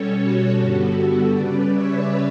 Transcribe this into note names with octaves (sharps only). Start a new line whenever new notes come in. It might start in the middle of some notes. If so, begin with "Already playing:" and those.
Already playing: B2 G3 C#4 A4 C#5
F#4 A4
G2 D3 G3 B3
C#3 G3 C#4 B4 D5
C#5 E5